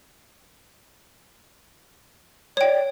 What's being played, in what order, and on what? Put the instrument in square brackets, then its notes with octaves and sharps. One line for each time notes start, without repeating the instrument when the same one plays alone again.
[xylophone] C#5 G5 [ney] D5